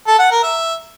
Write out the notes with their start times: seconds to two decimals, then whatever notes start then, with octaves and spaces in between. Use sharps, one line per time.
0.07 A4
0.19 F#5
0.31 A#4
0.43 E5